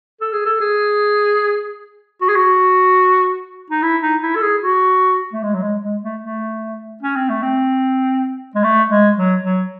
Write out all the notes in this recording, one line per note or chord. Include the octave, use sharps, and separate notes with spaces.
A4
G#4
A4
G#4
F#4
G#4
F#4
D#4
E4
D#4
E4
A4
G#4
F#4
A3
G#3
F#3
G#3
G#3
A3
A3
C#4
C4
A3
C4
G#3
A3
G#3
F#3
F#3